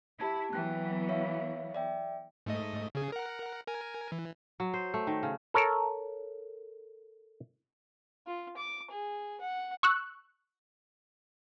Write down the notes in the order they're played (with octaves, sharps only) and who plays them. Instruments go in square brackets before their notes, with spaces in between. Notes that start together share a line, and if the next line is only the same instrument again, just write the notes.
[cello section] E4 [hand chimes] G4 A5 G#6
[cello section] E3 F#3 B3 [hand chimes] G5 F#6
[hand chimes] C#5 E5 F5
D5 E5 G5
[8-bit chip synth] G#2 A3 D#5
C#3 G#4
A#4 F#5
A#4 G#5
E3
[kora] F#3
C5
A3
D#3
C#3
[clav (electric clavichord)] A4 A#4 C#5
[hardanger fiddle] F4
D6
G#4
F#5
[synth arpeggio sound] C#6 E6 F#6